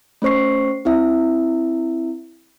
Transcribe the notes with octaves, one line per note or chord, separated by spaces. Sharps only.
A3 C#4 C5 C#6 C7
C4 E4 E5